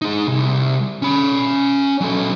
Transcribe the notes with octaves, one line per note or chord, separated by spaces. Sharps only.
D#4 G#4
C2
C#4 B5
F#3 A4